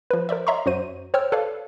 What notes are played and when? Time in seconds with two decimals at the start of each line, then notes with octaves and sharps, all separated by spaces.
0.11 F3 B4
0.29 A#4 C5 D5 E5
0.47 C#5 D#5 E5 A#5 C6 C#6
0.66 F#2 F#3 F#4 C5 D#7
1.14 C5 C#5 G5 E6 F6
1.32 A4 B4 C#5 D5 F5